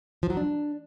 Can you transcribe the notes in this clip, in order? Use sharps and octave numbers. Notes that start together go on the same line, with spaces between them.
F3
F#3
D4